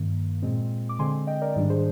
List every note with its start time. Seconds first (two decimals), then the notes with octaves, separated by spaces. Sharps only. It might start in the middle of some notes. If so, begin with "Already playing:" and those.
Already playing: G2 D#3 A#3
0.42 A#2 G#3 C4
0.89 D6
0.99 D3 G#3 C4 G#5 C6
1.27 D#5 G5
1.41 A#4 D5
1.56 G#2 D#3 G3 D4
1.70 G#4 C5